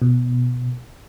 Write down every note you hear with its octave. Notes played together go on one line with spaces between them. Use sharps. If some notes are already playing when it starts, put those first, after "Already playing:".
B2